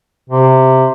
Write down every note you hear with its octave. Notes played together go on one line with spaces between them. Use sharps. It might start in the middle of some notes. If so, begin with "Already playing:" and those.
C3